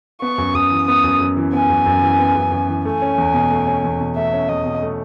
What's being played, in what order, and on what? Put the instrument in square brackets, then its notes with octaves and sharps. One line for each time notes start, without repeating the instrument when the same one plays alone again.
[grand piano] B3 [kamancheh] C#6
[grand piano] F#2
[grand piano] F#2 [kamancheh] D#6
[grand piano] E3
[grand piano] B3 [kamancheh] D#6
[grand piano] F#2
F#2
E3
[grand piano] B3 [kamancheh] G#5
[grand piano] F#2
F#2
E3
B3
F#2
F#2
E3
[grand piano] A3 [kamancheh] G#5
[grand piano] C#4
E2
B2
A3
C#4
E2
B2
[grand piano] A3 [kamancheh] E5
[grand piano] C#4
[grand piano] E2 [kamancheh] D#5
[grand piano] B2
A3